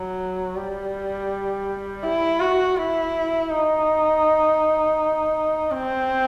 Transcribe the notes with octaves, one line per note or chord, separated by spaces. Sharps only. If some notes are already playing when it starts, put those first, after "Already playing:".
Already playing: F#3
G3
E4
F#4
E4
D#4
C4